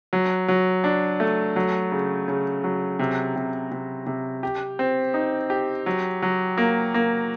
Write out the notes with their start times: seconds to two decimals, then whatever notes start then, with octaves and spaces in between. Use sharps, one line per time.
0.13 F#3
0.48 F#3
0.84 D4
1.20 A3
1.56 F#3
1.92 C#3
2.28 C#3
2.64 F#3
2.99 C3
3.36 C3
3.71 C3
4.06 C3
4.43 G4
4.79 C4
5.14 D#4
5.50 G4
5.86 F#3
6.22 F#3
6.58 A#3
6.94 A#3